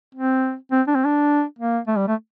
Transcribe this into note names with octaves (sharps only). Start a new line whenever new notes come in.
C4
C4
D4
C4
D4
A#3
A3
G3
A3